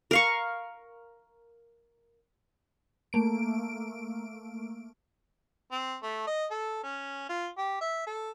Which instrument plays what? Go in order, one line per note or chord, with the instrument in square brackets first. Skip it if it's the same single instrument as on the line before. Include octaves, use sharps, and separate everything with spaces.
[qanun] A#4 F5 C#6
[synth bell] A3 A#3 D7
[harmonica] C4
A3
D#5
A4
C#4
F4
G4
E5
A4